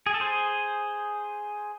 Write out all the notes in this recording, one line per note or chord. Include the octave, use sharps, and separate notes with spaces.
G#4
A4
G#4 C5